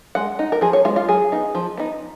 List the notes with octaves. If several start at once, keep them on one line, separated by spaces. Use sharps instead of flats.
G#3 F#5
D#4
A#4
F3 G#4
C#5
G#3 B3 F4
F4
F#3 G#4
B3 D#4
F3
B3 D#4